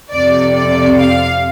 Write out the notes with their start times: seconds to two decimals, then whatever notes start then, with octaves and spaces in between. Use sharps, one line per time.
0.12 F2 C3 D5
0.55 D5
0.98 F5